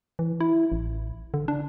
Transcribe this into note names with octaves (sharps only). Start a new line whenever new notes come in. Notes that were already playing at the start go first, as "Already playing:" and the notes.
E3
E4
A1
D3
D4